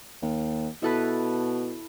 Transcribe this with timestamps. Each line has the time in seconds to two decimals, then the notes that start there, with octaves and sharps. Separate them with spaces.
0.22 D#2
0.82 B2 E4 A4 B4